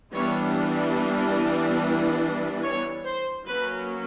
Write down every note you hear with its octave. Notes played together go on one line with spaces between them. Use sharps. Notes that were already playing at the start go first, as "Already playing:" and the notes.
E3 G3 B3 D4 C#5
C#5
C5
F#3 A#3 C#4 B4